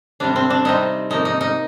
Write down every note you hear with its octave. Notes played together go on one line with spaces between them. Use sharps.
C3 G3 C4 D4
C4
D4
C3 G3 C4 D#4
C3 F3 A#3 D#4
D#4
D#4